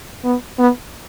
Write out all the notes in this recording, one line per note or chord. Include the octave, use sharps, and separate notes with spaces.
B3
B3